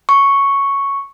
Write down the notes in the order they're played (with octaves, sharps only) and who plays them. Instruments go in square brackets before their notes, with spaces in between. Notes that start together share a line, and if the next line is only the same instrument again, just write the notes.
[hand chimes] C#6